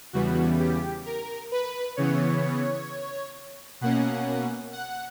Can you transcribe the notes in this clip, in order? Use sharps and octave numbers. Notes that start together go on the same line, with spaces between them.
E2 C#3 E3 G3 B3 F#4
G4
A#4
B4
C#3 E3 B3 C#5
B2 A#3 C#4 F#5
F#5